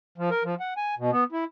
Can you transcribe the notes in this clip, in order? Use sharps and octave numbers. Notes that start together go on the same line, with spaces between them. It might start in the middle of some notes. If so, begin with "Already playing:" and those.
F3
A#4
F3
F#5
G#5
B2
B3
E4